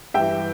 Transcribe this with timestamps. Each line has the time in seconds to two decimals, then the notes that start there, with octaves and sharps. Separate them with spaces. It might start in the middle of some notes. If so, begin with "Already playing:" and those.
0.14 G2 E3 E5 G5